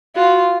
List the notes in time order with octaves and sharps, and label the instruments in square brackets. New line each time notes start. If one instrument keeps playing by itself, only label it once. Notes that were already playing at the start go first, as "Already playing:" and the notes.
[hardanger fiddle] F4 [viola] F#4